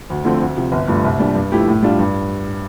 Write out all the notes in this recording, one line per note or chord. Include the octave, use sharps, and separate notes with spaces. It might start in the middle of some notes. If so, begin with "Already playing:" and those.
D2
D3 F3 A3 C4
D2
C3 F3
G1
G2 F3 A3
C2
A#2 G3 D4
G2
F3 A3 E4 G4
A2
G3 D4 F4
G2